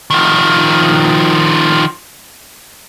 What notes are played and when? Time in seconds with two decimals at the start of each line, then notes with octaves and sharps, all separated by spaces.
0.10 D#3 F3